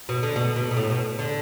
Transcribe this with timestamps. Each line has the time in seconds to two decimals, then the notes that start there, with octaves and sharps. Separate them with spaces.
0.09 B2
0.23 D3
0.36 B2
0.56 B2
0.71 B2
0.77 A2
0.90 B2
1.19 D3